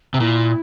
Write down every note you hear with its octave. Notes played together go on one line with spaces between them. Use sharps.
C3
A#2 E4